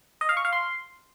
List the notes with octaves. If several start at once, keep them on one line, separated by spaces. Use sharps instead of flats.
D#5
F5
C#6
F5
C6